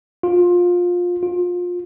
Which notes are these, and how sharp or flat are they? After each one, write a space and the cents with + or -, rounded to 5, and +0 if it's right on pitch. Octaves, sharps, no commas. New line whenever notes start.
F4 +20
F4 +25